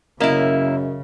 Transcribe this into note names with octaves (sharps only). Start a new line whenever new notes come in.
F#2 C#3 A#3 E4 A#4 D#5 E5